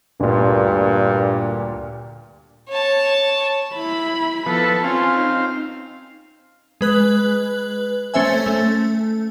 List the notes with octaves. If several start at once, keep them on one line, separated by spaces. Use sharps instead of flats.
D2 G2 A#2
C#5 A5
E4 B5
F3 B3 A4 B4
C4 C#4 F4 F5
D#4
G#3 B4 F#6 F#7
A3 C#4 C5 E5 G#5
A3